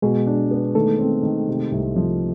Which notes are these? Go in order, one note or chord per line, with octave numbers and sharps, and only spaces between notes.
B2 G#3 G#4
D4
B3
D#3 A3 A4
C4
D#3
C3
C2
F3